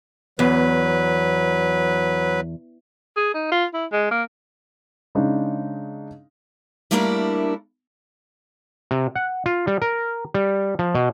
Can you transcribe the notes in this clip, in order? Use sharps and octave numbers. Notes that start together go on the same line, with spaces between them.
E2 F#3 B4
G#4
D#4
F4
E4
G#3
A#3
C#3 G#3 D4 D#4
G3 A3 A#3 D4 E4 A#4
C3
F#5
F4
G3
A#4
G3
F3
B2